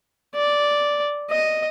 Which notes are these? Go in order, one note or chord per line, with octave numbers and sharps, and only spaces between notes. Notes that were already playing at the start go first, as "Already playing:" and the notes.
D5
D#5